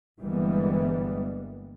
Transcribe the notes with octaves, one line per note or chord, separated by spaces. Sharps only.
G1 E3 G3 G#3 A#3 B3